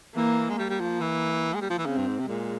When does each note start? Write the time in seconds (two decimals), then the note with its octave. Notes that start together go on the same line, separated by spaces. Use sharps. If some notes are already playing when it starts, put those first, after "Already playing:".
0.15 E3 A#3
0.50 G#3
0.58 G3 A#3
0.69 G3
0.80 F3
1.01 E3
1.54 G#3
1.61 G3
1.70 F3
1.78 E3
1.86 C#3 C4
1.97 G2
2.07 G#2
2.19 C3
2.28 A#2 G#3